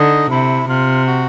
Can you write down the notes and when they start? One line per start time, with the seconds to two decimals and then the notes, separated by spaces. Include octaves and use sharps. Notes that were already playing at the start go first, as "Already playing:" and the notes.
Already playing: D3 D#4
0.30 C3 E4
0.68 C3 F4
1.07 F#4